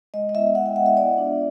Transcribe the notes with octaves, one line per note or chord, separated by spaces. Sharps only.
G#3 D#5
D#5
B3 E4 E5
G#3 F#5
G5
B3 E4 F#5
E5
B3 D5
D4 F4